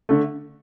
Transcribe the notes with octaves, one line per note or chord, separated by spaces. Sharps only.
D3 A3